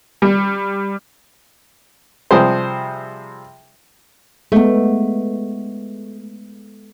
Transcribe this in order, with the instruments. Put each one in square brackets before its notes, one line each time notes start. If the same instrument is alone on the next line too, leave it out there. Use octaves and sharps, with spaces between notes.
[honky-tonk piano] G3
[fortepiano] C3 F3 G3 G#4 C5
[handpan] G#3 B3 [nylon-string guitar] A3